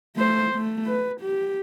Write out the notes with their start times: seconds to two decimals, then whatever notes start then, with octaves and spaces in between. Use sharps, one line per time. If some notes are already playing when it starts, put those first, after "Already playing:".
0.15 A3 C5
0.55 A3
0.86 B4
1.21 G4